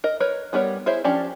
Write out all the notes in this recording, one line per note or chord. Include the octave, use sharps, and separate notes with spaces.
A#4 D#5
A#4 B4 C#5
G3 B3 A#4 C#5
E4 G#4 C5 C#5 E5
F3 C#4 D4 G4 D5